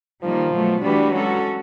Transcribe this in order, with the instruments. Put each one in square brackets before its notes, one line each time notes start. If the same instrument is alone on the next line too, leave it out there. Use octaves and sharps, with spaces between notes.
[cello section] D#3 G3 A#3 [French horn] F3
[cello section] B2 F#3 A3
[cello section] E3 A3 D4 F#4 B4 [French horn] G3
[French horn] F#3 [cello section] G#3 C#4 F#4 A4